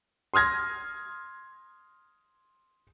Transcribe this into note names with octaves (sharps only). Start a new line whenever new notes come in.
C6 D#6 F6 G#6 A#6